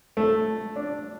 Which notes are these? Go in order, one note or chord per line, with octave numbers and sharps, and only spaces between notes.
A3
D4